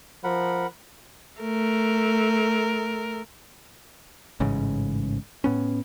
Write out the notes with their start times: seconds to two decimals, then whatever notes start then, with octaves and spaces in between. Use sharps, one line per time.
0.24 F3 A#4 F#5 B5
1.40 A3 A#4
4.40 A1 G#2 C#3
5.44 A2 B3 C#4